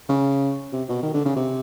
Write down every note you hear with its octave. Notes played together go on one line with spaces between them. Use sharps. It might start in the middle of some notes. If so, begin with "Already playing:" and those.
C#3
C3
B2
D#3
D3
C#3
C3